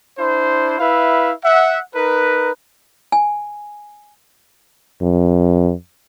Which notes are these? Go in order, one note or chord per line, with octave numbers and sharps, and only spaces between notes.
D4 E4 C5
E4 B4 E5 F5
E5 F#5
D#4 A#4 B4
G#5
F2